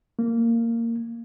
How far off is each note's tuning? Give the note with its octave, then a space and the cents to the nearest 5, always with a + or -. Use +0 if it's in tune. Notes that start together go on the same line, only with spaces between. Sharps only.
A#3 -15